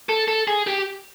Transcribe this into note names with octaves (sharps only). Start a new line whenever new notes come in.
A4
A4
G#4
G4